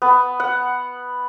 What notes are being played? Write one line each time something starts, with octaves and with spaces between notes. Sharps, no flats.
B3
F#5